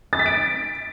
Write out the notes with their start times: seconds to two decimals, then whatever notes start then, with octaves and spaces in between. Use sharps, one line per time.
0.13 A6
0.19 B6
0.26 D7